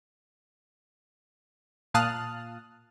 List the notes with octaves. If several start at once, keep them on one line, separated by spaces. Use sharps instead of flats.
A#2 F5 A5 D#6 F6 F#6